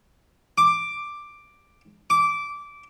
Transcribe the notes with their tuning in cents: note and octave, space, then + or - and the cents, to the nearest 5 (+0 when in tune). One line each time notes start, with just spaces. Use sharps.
D6 +5
D6 -15